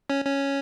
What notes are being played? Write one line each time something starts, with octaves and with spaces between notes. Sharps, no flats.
C#4
C#4